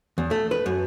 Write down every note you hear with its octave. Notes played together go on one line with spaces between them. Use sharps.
E2
A3
B4
F#2